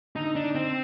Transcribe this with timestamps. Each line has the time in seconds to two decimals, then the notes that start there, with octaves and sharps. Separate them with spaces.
0.16 D3 D#4
0.35 D4 D#4
0.55 D3 C4